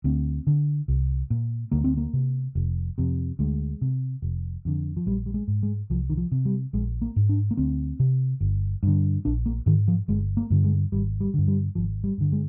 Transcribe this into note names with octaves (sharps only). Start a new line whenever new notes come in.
D2 C4
D3
C2
A#2
D2 A#3
C4
A#3
C3
F1
F2 C3
D2 G#3
C3
F1
F2 D3
F3
A#1 G3
G3
G#3
G#2
G#3
C2 F3
D#3
F3
C3
G3
A#1 G#3
A#3
G#2
D4
A#3
D2 C4
C3
G1
G2 D3
A#1 D4
A#3
G#2 D#3
F3
G1 G#3
A#3
G2 D3
G#3
G#1 G3
G3
G2 D3
G3
G#1 F3
G3
G2 D3
G#3